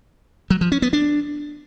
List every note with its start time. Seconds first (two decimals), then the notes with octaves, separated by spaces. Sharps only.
0.50 F#3
0.61 F3
0.72 C#4
0.82 B3
0.93 D4